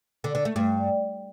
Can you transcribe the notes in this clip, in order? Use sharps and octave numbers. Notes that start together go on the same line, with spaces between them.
D3
D3
A3
G2